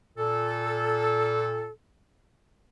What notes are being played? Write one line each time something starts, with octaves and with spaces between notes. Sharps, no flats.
A#2 A4